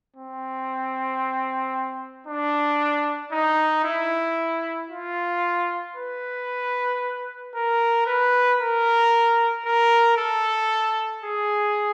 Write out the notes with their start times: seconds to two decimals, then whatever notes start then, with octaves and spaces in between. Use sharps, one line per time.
0.16 C4
2.27 D4
3.32 D#4
3.85 E4
4.90 F4
5.96 B4
7.55 A#4
8.07 B4
8.59 A#4
9.66 A#4
10.18 A4
11.24 G#4